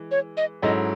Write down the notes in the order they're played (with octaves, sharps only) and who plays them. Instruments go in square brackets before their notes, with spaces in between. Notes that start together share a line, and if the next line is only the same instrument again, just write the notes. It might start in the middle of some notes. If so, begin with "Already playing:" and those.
Already playing: [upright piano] E3 G#3
[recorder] C#5
D#5
[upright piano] G#2 F#3 C#4 E4 A4 [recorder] D#5